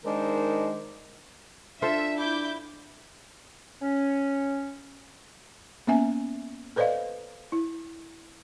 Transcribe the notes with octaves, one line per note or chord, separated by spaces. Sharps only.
D#3 G#3 D4 D#4 A#4 C5
D4 F4 A4 C5 E5
E4 D6 G6
C#4
A#3 B3 C#4 E5 G#5
A4 B4 C5 D5 D#5 F5
E4